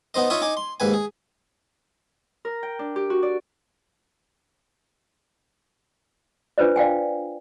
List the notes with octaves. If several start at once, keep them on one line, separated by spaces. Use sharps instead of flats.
B3 D#4 C5 D#5
D#4 F4 C#5 E5 C#6 D#6
D#4 G#5 D6
C6
D#2 G#2 B4 G#5
G#4
A#4
G5
D4
G4
F#4
D5
D4 F4 B4 C5 D5
D5 F5 G5 G#5